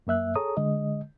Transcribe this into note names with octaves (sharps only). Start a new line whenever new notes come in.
F#2 A#3 E5 F#6
G#4 A4 C#5 A#5 D#6
D3 G#3 D#5